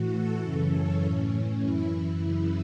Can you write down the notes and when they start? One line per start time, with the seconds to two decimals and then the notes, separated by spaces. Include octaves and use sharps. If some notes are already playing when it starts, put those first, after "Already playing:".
Already playing: A2 E3 F#4
0.14 A4
0.43 F#2 C#3 E3 A4
0.73 C#4
1.02 A2 E3
1.62 F#2 E3 E4
1.91 E4
2.21 F#2 C#3 E3